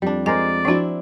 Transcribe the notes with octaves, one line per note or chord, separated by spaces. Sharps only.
F2 G3 D4
G#3 A#4 C5 D5 G#5
F3 C4 D4 E4 F#4